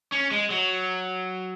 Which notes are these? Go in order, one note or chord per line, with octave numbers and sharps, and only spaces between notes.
C#4
G#3
F#3